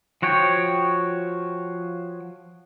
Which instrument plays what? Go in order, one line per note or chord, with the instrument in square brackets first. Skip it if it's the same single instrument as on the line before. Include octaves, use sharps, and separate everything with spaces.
[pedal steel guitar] F3 F#4 C#5 G5